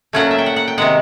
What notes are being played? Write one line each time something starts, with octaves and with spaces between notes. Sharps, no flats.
A#2 F#3 A3 C#4 F#5
E5
G5
F#5
F#5
G5
C3 D#3 G#3 F#5